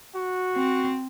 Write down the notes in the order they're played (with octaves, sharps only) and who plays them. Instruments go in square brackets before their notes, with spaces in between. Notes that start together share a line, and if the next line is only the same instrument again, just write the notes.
[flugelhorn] F#4
[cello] C4